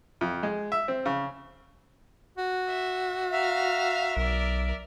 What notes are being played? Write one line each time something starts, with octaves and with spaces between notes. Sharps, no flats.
F2
G#3
E5
C4
C#3
F#4
E5
E5 F5 A#5
B1 A#4 D5